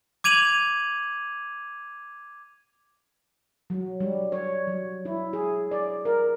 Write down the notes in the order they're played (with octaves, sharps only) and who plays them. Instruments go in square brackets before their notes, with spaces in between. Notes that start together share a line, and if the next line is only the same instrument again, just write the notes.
[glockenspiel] D6 G#6 D#7 F7 F#7
[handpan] F#3
G3
C#5
F#3
E4
G#4
D5
A#4